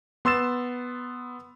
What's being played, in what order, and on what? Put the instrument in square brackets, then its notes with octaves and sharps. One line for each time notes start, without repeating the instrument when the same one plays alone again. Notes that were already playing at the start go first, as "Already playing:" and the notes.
[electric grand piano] B3 C6 E6 A6 E7